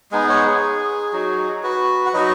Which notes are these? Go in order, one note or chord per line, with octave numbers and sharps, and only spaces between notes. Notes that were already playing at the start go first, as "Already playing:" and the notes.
G#3 B3 D#4 G#4
C#5 F#5
G#4
F#3 D#4 F#4
F#4 B4
F#5
F#3 D#4 F#4 B4 D#5